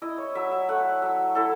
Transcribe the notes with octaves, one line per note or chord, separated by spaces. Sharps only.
E4 D#5
C#5
F#3 E5
E5
A3 F#5
F#3 E5
E4 A4